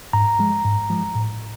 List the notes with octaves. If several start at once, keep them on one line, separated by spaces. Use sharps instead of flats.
G#2 A#5
F3 G#3
G#2
F3 G#3
A2